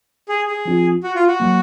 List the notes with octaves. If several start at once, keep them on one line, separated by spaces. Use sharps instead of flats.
G#4
G#4
F3 C4 F4
F#4
F4
F#4
F#3 A#3